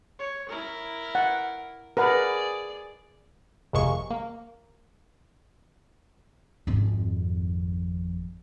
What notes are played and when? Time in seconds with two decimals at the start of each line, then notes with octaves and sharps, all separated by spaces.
0.19 C#5
0.49 E4 A#4
1.15 F#5
1.97 G#4 A#4 B4 D5 F#5
3.73 G#1 F2 C3 G#3 A#3 C#6
4.11 A#3
6.67 G#1 F2